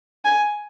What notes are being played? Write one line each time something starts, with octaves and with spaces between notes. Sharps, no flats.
G#5